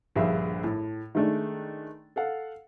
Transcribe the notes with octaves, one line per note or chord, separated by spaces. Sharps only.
A#1 G2 D3 G#4 E5 F5
A2
D#3 G#3 A3 D4
A4 F5 F#5